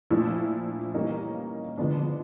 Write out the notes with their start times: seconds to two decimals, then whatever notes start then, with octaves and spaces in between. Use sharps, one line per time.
0.10 A#2 F3 A3 D4 E4
0.94 E3 G3 A#3 C#4 D#4
1.78 D3 F3 G#3 B3 D4